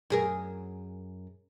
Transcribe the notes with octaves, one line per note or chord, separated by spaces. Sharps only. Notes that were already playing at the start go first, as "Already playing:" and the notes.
F#2 G#4 A#4